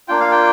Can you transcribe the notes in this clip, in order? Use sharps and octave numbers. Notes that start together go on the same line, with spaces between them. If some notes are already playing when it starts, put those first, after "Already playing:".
A#3 D4 F4 G5
F5
G5